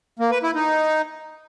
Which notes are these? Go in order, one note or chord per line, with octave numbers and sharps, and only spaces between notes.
A#3
B4
E4
D#4